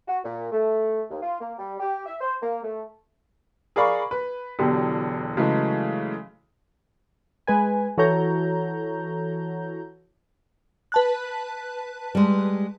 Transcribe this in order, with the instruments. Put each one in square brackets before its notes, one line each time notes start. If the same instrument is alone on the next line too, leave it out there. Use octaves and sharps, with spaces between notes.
[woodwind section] F#4
A#2
A3
D#2
F4
A#3
G3
G4
E5
C5
A#3
A3
[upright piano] G#4 A#4 D5 F5 B5 C#6
B4
E1 E2 D3 F#3 G4
C#3 E3 F#3 G#3 A3
[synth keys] G#3 B4 G#5
E3 F#4 A4 C#5 A#5 G6
[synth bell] B4 A5 F#6
[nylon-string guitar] G3 G#3